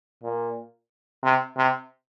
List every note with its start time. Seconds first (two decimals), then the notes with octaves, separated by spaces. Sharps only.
0.23 A#2
1.24 C3
1.57 C3